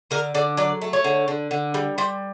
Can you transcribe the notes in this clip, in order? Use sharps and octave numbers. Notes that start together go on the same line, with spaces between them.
D3 A#4
D3 D5
F#3 D5
A3
C#5
D3
D3
D3
G3
G3 C5